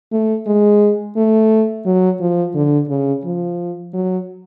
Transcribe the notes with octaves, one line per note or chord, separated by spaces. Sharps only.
A3
G#3
A3
F#3
F3
D3
C#3
F3
F#3